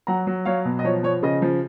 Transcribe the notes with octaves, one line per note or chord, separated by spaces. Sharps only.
F#3 F#5 A#5
F#3
F#3 C#5 F5
B2
D#5
F3 C#5
F3 C#5
C#3 D#5
F3